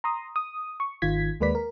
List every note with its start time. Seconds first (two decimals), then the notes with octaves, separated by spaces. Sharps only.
0.04 A#5 C6 D#6
0.36 D#6
0.80 C#6
1.02 G#1 D#3 F4 G#6 B6
1.40 D#2 G#3 A#3 B4 D5 B6
1.55 A#4